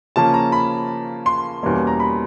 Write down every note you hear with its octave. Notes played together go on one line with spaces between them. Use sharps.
C#3 F3 A#3 C#4 A5
A#5
B5
C6
E2 B2 G3 A#3 C#4
A#5
B5